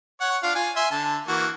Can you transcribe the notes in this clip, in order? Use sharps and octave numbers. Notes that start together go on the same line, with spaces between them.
C#5 F#5
D4 F4 F5
F4 G#5
E5 G#5 C6
D3 A5
E3 A#3 F#4